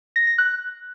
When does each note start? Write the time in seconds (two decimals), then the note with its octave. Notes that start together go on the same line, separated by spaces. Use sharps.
0.16 A#6
0.27 A#6
0.38 F#6